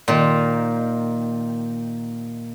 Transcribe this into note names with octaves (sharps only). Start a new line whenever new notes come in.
A#2 D#3